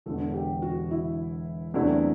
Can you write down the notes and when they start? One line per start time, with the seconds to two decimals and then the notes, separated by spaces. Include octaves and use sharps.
0.06 E1 E2 D3 A4
0.34 G4
0.62 F#4
0.91 E4
1.74 E2 C3 F#3 A3 D4 E4